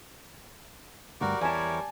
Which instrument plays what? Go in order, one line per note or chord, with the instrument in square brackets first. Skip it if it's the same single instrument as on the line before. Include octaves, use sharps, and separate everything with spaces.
[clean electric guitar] D2 G2 [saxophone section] G3 D5 [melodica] F#4 A#4
[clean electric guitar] E2 E4 [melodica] A#4 C#5 [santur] G#5 A5